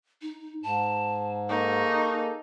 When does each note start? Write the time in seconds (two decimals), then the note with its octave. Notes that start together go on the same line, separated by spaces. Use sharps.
0.22 D#4
0.63 G#2 A5
1.49 A#3 D#4 G#4 A4 C#6